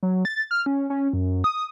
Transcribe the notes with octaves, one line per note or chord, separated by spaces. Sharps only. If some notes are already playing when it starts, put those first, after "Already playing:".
F#3
A6
F6
C#4
C#4
F#2
D#6